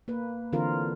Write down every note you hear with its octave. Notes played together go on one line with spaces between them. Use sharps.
A#3 B4
D3 E3 C4 F4 A#4